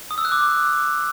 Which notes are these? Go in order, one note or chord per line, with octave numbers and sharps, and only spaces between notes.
D#6
E6
F#6
D6